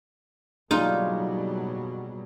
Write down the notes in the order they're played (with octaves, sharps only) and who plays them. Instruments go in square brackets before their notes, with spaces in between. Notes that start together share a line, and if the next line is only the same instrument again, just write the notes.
[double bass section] B2 F#3 G3 [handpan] A#3 D4 G#4 [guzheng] D#4 F4